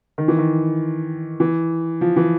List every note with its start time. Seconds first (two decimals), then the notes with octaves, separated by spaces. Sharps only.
0.18 D#3
0.28 E3
0.39 D#3
1.40 E3
2.01 F3
2.16 E3